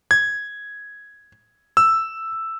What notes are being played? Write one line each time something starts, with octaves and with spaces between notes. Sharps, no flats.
G#6
E6